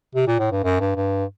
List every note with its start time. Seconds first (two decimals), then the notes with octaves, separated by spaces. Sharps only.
0.15 C3
0.27 A#2
0.39 A2
0.52 G2
0.64 F#2
0.80 G2
0.96 G2